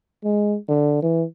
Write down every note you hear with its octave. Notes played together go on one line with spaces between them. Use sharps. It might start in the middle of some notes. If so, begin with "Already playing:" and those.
G#3
D3
E3